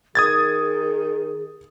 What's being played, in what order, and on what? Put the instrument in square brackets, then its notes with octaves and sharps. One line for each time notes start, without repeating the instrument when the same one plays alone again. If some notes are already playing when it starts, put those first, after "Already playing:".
[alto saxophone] D#3 [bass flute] G#4 [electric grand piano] D#6 G#6 A6